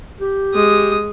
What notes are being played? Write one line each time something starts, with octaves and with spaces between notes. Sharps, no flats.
G4
G#3 D#6